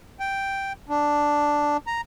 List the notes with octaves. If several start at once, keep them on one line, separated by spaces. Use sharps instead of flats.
G5
D4
A#5